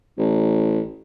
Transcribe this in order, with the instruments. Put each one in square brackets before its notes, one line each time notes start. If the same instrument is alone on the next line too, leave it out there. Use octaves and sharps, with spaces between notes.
[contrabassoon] A1